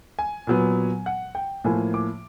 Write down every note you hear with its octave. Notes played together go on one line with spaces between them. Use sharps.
G#5
A#2 F#3 B3
F#5
G5
A2 F3 A#3 G#5
D6